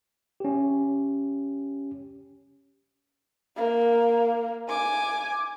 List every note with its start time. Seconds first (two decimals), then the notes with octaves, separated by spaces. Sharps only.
0.40 C#4 G4
3.56 A#3
4.68 G#5 D6